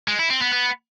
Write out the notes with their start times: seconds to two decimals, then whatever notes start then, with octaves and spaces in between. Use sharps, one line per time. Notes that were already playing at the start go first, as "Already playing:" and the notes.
0.08 G#3
0.19 E4
0.30 C4
0.41 B3
0.53 B3